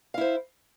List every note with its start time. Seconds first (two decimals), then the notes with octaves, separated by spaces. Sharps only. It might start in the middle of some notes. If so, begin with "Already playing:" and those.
0.14 F5
0.18 E4
0.21 C5